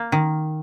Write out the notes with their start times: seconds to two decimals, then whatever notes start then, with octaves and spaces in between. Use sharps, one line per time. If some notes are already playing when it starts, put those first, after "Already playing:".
Already playing: A#3
0.12 D#3